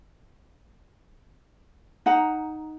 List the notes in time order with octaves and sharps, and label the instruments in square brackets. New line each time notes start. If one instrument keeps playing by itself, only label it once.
[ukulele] D#4 F#5 A#5